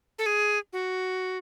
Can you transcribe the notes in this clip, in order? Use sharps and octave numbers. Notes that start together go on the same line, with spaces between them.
A4
G#4
F#4